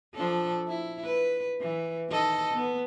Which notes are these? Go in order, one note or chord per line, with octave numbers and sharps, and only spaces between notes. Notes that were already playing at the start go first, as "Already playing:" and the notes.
F3 D4 A4
E4
B4
E3
D#3 A4 D#5
B3